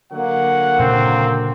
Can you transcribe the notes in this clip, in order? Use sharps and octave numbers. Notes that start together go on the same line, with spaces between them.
D3 F#3 A#3 F#5
A#2 C#3 C4 D4